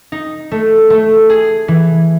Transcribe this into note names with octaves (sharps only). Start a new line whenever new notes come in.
D#4
A3
A3
G#4
E3